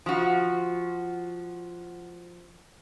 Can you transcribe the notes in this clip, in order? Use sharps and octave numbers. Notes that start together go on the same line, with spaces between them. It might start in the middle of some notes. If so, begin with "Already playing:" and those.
F3 F#4